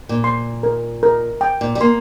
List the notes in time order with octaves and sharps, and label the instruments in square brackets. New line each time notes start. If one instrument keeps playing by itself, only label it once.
[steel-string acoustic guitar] A#2
[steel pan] C6
A#4
A#4
G5
[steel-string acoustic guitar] A#2
G3
[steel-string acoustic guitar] A#3 [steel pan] C6